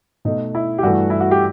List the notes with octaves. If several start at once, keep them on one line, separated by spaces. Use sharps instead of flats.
B2 A3 D#4
E4
G4
G2 E3 A3 F#4
E4
F#4
G4